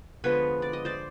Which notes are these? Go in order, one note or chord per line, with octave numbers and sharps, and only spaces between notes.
D3 F3 G#3 B3 B4 C#5
D5
D#5
C5 D5